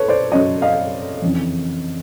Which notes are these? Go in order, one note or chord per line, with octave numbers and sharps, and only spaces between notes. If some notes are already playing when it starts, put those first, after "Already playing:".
Already playing: A4 B4 C#5
C5 D5
F#2 C#3 F#3 C#5 D#5
D#5 F5
F2 C#3 E3